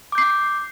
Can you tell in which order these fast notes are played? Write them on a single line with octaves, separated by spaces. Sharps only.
D6 G6 C7